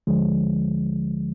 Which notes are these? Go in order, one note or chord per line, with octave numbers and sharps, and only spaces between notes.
D2 D3 F3 G#3